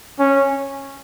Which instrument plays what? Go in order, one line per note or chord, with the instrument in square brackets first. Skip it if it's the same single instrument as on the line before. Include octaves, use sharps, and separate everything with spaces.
[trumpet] C#4